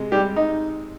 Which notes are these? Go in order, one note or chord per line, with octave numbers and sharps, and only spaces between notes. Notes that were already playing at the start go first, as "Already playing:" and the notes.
Already playing: C3 G#3
G3 G4
D#4